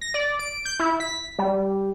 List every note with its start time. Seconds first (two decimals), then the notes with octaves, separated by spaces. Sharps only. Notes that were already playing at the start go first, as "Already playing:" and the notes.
0.01 A#6
0.14 D5
0.39 D7
0.65 G6
0.80 E4
1.00 B6
1.39 G3